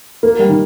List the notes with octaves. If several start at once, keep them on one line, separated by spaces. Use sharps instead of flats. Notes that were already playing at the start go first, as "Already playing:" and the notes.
A#3
G3
D#3